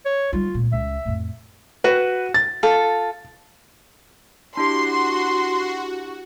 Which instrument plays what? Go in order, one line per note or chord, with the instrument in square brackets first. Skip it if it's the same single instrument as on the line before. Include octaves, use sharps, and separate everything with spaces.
[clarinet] C#5
[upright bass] G3 D#4 [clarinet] F4
[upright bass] C#2 A#2
[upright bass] C#2 [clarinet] E5
[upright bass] F2 A2
[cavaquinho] F#4 [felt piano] B4
[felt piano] A6
[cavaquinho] F4 A4
[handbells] D4 E4 G4 [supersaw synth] F#4 [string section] C6